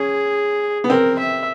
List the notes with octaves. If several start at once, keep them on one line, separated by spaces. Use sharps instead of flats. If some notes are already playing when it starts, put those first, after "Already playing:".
Already playing: C#4 G#4
B3
C4 A#4
E5